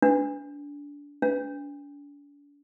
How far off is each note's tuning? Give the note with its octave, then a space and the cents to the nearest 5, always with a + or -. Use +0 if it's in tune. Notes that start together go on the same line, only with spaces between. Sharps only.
D4 -25
D4 -40